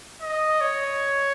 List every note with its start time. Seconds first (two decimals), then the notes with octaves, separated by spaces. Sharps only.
0.22 D#5
0.61 C#5